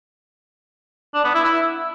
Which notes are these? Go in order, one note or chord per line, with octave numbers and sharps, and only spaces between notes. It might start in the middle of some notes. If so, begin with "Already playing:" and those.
D4
B3
E4
E4